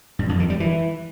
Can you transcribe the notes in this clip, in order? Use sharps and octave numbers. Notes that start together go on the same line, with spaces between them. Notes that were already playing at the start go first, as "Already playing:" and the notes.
G2
F2
D#3
G3
E3